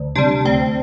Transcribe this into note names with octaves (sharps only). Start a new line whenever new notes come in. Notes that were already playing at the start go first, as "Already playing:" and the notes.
Already playing: D2
C3 G3 D4
D2 C4